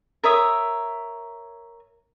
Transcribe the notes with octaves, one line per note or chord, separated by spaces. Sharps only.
A#4 C#5 E5 D#6